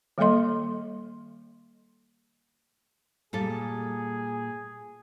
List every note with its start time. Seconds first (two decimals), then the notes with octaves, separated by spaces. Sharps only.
0.18 D#3 G3 A#3 A4 D#5 C6
3.33 A#2 G3 G#4 A4